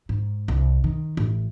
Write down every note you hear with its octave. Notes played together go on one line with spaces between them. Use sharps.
G#2
C2
D#3
A1